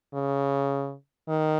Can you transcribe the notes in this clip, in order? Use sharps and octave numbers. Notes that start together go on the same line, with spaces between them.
C#3
D#3